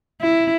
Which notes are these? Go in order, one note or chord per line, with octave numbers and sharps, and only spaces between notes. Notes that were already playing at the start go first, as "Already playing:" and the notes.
E4